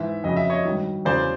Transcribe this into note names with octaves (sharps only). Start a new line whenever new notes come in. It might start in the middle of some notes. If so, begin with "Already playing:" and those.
Already playing: G#2 E3 E5
F2 C#3 F#3 D#5
E5
C#5 D#5
G2 D#3 F#3
E2 C#3 F#3 C5 D5